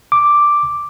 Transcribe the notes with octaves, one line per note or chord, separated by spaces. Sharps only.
D6